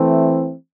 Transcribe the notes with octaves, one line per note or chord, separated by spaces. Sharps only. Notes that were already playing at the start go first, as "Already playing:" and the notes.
Already playing: E3 A3 C4